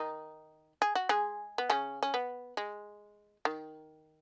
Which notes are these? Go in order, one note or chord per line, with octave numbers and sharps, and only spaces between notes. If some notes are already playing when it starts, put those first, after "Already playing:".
Already playing: D#3 D#4
G#4
F#4
G#3 G#4
B3
C#3 C#4
C#4
B3
G#3
D#3